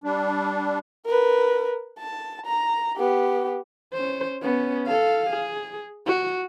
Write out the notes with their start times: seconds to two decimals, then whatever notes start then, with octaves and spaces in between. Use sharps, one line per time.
0.04 G3 D4
1.06 A#4 B4
1.99 A5
2.46 A#5
2.97 B3 G4
3.94 C#4 C5
4.42 B3 C#4
4.87 A4 F5
5.31 G#4
6.07 F#4